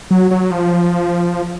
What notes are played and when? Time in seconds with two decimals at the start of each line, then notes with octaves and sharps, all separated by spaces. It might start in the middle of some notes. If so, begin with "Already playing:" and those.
0.11 F#3
0.31 F#3
0.51 F3